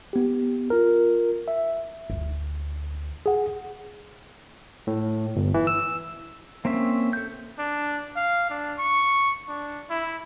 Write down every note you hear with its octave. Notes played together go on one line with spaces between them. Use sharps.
B3 G4
F4 A#4
E5
D2
G#4 F#5
A2
G1
E3
E6
A#3 C4 C#4 E5
A4 G6
D4
F5
D4
C#6
D4
E4